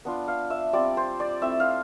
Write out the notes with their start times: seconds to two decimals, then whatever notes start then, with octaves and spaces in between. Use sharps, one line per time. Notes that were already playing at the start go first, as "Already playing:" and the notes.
0.05 B3 D4 F4
0.28 F5
0.50 E5
0.73 G3 C4 F4 D5
0.97 C5
1.20 D5
1.41 A3 C4 E4 E5
1.60 F5